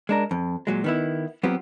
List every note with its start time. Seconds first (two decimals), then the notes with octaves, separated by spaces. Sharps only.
0.09 G#3 D4 A#4
0.31 F2
0.67 A#2 F#3 G#3
0.84 D#3 B3 E4
1.43 F#3 B3 C4 F4 G4